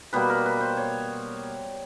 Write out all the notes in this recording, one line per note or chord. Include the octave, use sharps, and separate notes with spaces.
B2 G3 A#3 B4
A#4
B4
C5
C#5